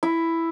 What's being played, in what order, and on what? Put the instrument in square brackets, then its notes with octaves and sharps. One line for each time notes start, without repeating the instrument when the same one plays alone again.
[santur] E4